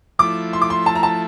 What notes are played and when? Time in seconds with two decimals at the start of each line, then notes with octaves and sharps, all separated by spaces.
0.19 F3 A3 E4 D6
0.53 C6
0.61 D6
0.70 C6
0.86 A5
0.95 A#5
1.03 A5